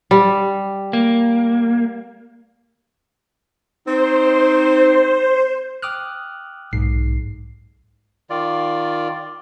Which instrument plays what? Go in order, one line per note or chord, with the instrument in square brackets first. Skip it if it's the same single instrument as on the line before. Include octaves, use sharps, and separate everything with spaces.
[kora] G3
[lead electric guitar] A#3
[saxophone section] C4 D#4 [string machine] C5
[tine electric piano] G5 D6 D#6 F6 F#6
B1 G#2 C7
[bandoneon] D#3 F4 D5